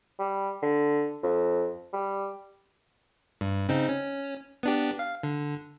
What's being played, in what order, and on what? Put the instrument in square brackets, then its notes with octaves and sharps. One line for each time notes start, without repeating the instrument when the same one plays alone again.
[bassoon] G3
D3
F2
G3
[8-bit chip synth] G2
C#3 C4 D#4
C#4
B3 D4 G4
F5
D3